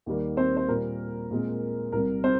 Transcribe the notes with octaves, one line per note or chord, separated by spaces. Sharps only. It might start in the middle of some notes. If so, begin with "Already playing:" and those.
D#2 D#3 G3 A#3
C4 C5
C5
A#2 G3 A#3 A#4
A#2 G#3 C4
C2 C3 G3 A#4
C4 C5